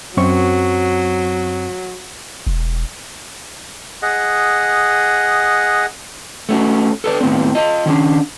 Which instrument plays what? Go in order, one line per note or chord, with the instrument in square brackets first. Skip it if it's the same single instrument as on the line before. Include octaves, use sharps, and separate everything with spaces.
[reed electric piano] F#2 C4 C#6 [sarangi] F#3
[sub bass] E1
[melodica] G#4 D#5 F#5
[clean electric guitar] A3 C#4 F#4
A4 B4 C#5 D5
D#2 A2 E3 B3 C4
F4 D#5
D#3 C#4 D4